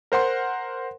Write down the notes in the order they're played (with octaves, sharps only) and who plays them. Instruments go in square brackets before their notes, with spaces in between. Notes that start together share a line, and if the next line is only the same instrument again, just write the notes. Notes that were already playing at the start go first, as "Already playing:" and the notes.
[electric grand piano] A#4 C5 F#5 C6